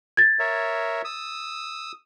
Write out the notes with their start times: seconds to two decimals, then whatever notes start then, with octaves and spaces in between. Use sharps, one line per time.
0.17 G#6 A6
0.39 A#4 C#5 E5
1.05 D#6 E6